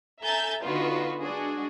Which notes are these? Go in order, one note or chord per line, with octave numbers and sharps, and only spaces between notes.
A4 E5 G#5 A#5 G6 A6
D3 B3 D#4 F4 F#4 B4
G#3 D4 F#4 G#4